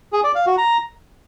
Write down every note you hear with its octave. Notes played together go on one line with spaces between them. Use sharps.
G#4
D5
F5
F#4
A#5